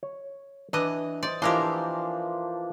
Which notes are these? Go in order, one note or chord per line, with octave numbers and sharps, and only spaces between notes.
C#5
E3 D4 D#5
C5 D5 D#5
E3 F3 A#3 D4 G4 A#4 C5 D#5